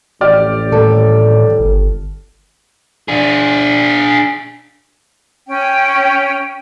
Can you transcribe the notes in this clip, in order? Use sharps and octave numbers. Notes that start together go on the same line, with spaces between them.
A1 F2 G4 D5 F6
D#2 A2 G3 A4
G1
D4 G#4
C#4 G5